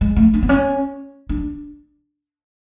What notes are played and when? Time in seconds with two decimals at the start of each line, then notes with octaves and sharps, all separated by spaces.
0.01 G#3
0.16 A3
0.34 D4
0.43 B3
0.49 C#4
1.29 D4